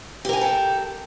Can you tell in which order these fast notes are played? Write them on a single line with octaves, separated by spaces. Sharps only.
G4 A#4 G#5 G5 A4